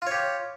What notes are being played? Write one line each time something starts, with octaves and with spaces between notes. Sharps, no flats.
F4 G4 C#5